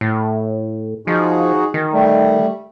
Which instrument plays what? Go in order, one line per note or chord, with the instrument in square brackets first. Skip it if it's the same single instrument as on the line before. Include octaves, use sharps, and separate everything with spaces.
[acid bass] A2
[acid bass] F3 [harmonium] D#4 F#4 G#4
[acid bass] D#3
[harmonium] G3 A3